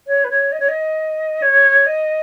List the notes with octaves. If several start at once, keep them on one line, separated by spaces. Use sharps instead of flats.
C#5
B4
C#5
D#5
C#5
D#5
C#5
D#5